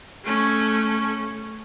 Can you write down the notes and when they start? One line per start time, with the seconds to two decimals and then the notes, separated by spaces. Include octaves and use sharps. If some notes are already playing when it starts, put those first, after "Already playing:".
0.25 A3 C#4